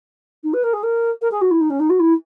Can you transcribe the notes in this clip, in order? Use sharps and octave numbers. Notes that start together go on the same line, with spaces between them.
D#4
B4
A#4
G#4
A#4
A#4
G#4
F#4
E4
D#4
C#4
D#4
F#4
E4